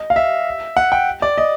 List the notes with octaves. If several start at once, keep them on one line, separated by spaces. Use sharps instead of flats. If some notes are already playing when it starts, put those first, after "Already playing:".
Already playing: D#5
F5
E5
F#5
G5
D5
D#5